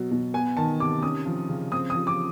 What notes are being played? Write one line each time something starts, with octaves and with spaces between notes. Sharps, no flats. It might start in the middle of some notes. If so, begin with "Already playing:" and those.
Already playing: B2 F#3
B2
B3 G#5
D#3 A5
C3 D6
C#4 D#6
F3
C#3
C4 D#6
D#6
F3
D6